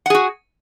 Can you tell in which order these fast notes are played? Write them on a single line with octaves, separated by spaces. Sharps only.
F#5 G#4 F#4